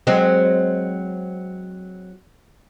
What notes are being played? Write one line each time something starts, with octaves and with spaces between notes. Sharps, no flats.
F#3 G#3 C4